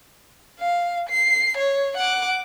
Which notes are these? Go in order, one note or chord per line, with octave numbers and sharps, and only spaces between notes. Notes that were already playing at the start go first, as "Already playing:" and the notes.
F5
C7
C#5
F#5 D6